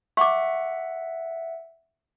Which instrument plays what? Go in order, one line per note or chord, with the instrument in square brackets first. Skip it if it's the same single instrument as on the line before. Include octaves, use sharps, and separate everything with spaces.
[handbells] E5 F#5 [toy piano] C#6 D6